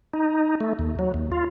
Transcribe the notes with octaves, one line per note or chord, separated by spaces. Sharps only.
D#4
A3
D#2
F#3
D#2
F4